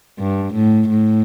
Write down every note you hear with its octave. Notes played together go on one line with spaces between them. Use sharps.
G2
A2
A2